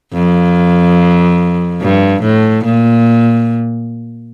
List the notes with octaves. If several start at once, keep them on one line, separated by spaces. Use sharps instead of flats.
F2
G2
A2
A#2